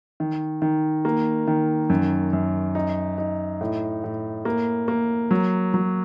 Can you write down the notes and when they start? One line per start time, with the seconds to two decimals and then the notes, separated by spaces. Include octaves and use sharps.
0.20 D#3
0.62 D#3
1.05 A#3
1.47 D#3
1.90 F#2
2.33 F#2
2.75 D#4
3.18 D#4
3.61 A2
4.04 A2
4.45 A#3
4.88 A#3
5.31 F#3
5.74 F#3